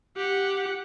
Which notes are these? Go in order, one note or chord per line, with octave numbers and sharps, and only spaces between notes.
G4 F#5